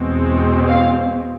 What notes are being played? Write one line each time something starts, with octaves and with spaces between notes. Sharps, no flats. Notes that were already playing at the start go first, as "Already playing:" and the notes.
Already playing: E2 B2 G#3 C4
F5